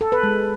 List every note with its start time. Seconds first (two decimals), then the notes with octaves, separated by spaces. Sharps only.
0.01 A4
0.12 B4
0.23 G#3